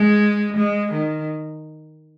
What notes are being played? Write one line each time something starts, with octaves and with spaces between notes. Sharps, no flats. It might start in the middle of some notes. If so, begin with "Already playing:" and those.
Already playing: G#3
G#3
D#3